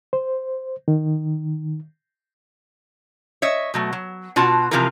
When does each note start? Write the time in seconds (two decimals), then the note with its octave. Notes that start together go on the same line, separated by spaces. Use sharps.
0.13 C5
0.88 D#3
3.42 C#5 D#5 E5
3.74 B2 F#3 A3
3.93 F#3
4.36 B2 F4 F#4 F#5 A5
4.71 C3 E3 F3 F4 G#4 A#4